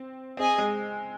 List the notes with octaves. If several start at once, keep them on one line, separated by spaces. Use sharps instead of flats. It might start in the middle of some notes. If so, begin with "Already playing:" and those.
Already playing: C4
C4 G#4 D#5 G#5
G#3